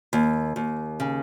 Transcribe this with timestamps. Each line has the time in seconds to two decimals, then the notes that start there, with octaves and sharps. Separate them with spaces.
0.13 D#2
0.56 D#2
1.00 C#3